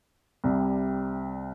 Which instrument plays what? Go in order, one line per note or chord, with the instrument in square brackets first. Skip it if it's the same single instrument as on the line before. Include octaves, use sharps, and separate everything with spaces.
[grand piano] C2 C3 G3